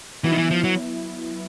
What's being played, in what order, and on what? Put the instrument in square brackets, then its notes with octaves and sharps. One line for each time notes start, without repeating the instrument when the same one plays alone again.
[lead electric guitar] E3 [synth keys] F#3 B3 E4
[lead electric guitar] D#3
E3
F3
F#3